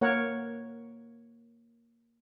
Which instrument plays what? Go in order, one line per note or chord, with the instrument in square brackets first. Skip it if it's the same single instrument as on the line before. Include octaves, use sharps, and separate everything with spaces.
[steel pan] A#3 A#4 C#5 F#5